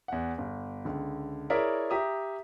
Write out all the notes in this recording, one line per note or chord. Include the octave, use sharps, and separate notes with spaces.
E2 F#5
G1
C#2 D3
E4 G#4 A#4 C#5 D5 E5
G4 E5 A#5 D#6